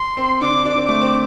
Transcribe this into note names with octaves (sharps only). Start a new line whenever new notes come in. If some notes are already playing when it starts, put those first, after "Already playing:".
Already playing: C6
C4
D3 D4 D6
D4
C4
A3 D6
C4